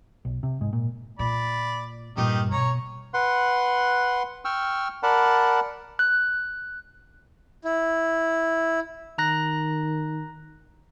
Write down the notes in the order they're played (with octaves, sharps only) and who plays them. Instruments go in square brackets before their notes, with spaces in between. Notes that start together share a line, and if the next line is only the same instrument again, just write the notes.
[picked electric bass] B1
C3
G#2
A#2
[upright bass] A#2 [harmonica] D5 B5
[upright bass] G2 A#2 [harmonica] D#3 G4
[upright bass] B2 [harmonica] C#5 A#5
[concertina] B4 F#5 C6
G5 C#6 E6 F6
A#4 D5 F#5 A5 B5
[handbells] F#6
[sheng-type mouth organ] E4
[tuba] D#3 [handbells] A#5 F#6 A#6